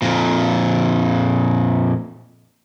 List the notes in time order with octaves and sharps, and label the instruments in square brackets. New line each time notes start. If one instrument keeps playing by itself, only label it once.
[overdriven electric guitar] F2 A#2